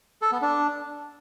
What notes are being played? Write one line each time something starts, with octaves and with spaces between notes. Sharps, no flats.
A4
B3
D4